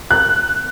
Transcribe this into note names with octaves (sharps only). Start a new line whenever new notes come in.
F#6